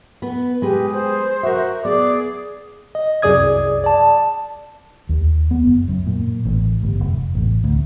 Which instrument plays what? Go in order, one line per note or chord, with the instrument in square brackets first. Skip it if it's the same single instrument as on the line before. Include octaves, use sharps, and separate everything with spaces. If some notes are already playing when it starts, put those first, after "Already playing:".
[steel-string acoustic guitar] B3 B4
[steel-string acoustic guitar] G#3 B4 [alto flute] G4 [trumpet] G#4
[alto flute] C5
[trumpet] F#4 [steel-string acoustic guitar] A#4 E5
[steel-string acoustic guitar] B3 [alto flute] G#4 [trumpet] D5
[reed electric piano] D#5
C2 F#2 G#4 D5 D#6 G#6
D5 A5
[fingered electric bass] D#2
B3
F#1
F#2
A#2
A1
G1
F1
A1
D2